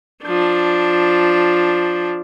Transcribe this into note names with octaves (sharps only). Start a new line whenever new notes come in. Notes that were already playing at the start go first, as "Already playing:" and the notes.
F3 D4